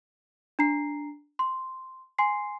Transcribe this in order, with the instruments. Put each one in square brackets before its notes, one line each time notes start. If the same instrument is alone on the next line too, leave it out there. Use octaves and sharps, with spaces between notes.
[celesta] D4 A#5 C7
C6
G#5 C6 C7